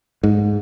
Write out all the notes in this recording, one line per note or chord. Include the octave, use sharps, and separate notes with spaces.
G#2